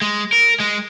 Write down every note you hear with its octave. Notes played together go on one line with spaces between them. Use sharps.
G#3
A#4
G#3